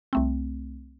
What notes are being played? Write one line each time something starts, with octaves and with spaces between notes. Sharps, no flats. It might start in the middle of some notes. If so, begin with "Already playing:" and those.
C2 A3 C4